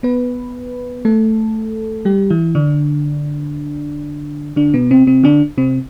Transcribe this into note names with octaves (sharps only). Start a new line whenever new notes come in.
B3 B4
A3 A4
G3 G4
E3 E4
D3 D4
D3 D4
B2 B3
C3 C4
C3 C4
D3 D4
C3 C4